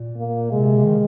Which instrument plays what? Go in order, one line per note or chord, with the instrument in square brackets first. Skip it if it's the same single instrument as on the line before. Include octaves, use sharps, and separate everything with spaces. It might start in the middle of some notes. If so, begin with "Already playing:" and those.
Already playing: [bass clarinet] A#2
[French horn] A#3
[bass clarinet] C3 [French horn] G#3
[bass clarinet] C3
D#3